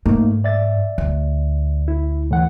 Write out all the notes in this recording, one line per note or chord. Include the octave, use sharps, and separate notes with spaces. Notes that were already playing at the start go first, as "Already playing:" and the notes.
G#2 A3 A#3 D#4
D5 E5 A6
D2
E4
A2 E3 F#5